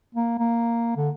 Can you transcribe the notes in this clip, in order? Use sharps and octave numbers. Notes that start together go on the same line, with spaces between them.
A#3
A#3
D3